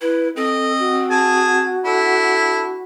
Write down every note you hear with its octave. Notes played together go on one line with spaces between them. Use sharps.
E4 B4
C4 A4 D#5
F#4
G#4 A5
D4 E4 A4